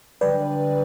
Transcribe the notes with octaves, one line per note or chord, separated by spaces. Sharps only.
D3 G3 B4 D5